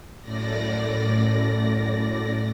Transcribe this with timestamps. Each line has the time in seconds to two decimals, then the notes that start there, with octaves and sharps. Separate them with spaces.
0.21 F#2 A2 D5 A#6